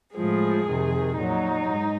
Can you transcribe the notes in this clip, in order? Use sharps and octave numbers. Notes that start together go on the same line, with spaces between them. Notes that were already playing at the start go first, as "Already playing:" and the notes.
A2 F3 G#3 G#4
F2 C3 D#3
A#2 F#3 D#4
G#2